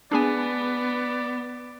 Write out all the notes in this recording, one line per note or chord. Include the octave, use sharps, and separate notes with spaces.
B3 D4 G#4 D5 G#5